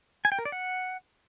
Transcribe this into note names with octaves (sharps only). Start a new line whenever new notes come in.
G#5
G5
A#4
D5
F#5